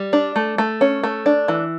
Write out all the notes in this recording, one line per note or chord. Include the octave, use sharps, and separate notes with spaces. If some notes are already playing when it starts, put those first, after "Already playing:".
Already playing: G3
D4
A3
A3
C#4
A3
D4
E3